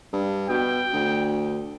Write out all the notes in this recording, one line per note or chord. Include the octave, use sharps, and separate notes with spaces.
G2
B2 G5
D2